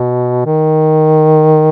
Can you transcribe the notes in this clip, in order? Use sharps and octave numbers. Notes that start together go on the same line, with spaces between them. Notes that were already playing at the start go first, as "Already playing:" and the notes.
Already playing: B2
D#3